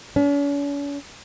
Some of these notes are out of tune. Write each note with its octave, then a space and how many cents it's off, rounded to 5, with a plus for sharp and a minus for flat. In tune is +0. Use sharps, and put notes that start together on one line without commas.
C#4 +45